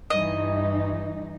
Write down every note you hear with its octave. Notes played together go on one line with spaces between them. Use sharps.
G2 E3 D#4 D#5